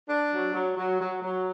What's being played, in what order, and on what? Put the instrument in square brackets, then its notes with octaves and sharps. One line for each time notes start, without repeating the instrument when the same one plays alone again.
[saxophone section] D4
F#3
F#3
F#3
F#3
F#3